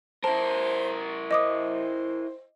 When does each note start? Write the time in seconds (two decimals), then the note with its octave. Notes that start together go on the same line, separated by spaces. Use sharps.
0.24 E4 A#4 C5 A5
1.31 C5 D#5 D6 D#6